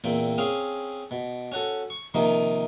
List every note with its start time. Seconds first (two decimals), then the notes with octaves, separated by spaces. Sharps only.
0.04 E2 A#2 C4 G5
0.38 C4 C#4 G#4 F5
1.11 B2
1.52 C#4 F#4 A4
1.90 C#6
2.14 C3 D#3 F3 A#3 D#4